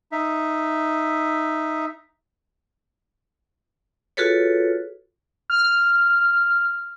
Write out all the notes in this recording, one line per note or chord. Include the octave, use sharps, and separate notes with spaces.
D#4 E5
F4 F#4 G#4 A4 B4 C#5
F6